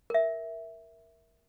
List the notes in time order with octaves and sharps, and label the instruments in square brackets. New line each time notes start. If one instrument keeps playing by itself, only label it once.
[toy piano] A#4 E5